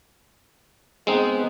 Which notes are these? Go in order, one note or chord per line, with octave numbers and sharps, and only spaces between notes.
G#3 B3 C4 D#4